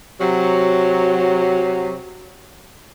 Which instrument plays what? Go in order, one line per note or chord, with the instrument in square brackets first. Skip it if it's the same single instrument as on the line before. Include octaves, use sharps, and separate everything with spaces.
[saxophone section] C3 F#3